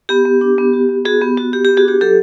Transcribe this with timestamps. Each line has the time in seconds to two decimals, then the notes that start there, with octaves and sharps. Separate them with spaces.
0.09 B3 G4
0.26 B3
0.41 D4
0.58 B3
0.73 F#4
0.89 B3
1.05 B3 F#4 G#4
1.21 B3 G4
1.38 B3 F#4
1.53 F#4 G4
1.65 B3 G4
1.77 F#4 G#4
1.85 D4 G4
2.01 F#3 G4 A4